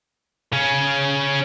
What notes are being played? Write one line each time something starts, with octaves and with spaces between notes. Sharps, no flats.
C#3 C#4